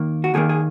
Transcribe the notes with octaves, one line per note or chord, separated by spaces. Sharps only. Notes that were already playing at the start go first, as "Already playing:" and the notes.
Already playing: D#2 D#3 A#3
F#4
D#2 D#3 A#3 G#4
G#4